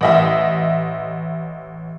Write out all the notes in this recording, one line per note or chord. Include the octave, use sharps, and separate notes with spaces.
A1 D#5 E5